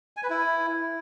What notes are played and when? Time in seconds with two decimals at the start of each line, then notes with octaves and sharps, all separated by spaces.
0.17 G#5
0.23 B4
0.30 E4